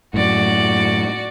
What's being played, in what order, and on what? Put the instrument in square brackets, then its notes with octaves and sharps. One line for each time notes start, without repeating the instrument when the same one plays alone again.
[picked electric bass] F#2 A2 [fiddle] F#4 D5